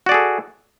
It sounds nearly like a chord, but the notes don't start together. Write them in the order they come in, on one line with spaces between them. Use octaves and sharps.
F#4 D5 G#4 A4